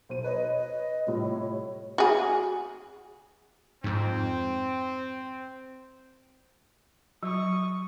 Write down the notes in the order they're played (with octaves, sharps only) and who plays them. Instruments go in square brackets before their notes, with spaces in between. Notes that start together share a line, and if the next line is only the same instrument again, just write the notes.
[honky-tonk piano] B1 C5 D#7
[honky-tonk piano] B4 C#5 [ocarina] D#5
[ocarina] D#5
[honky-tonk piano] A2 C3 G3 [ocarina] F4
[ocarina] C#5
[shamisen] F#4 G#4
[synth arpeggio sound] F2 G#2 [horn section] C4
[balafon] F#3 [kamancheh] C#6 D#6